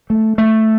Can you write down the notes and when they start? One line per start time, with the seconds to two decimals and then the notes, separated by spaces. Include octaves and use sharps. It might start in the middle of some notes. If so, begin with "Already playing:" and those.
0.10 A3
0.38 A3